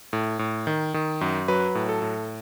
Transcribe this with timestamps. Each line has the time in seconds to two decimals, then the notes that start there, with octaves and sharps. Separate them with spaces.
0.13 A2
0.39 A2
0.67 D#3
0.94 D#3
1.21 F#2
1.48 F#3 B4
1.75 A2
1.89 A4
2.02 A2